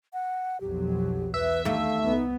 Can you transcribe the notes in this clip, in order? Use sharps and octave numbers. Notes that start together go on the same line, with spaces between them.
F#5
B1 F2 F#3 G4
E2 B4 E5
D#2 A3 F5
C2 B3 D#4